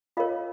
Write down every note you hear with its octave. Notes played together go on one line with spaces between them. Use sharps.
F4 A#4 C#5 D#5 F5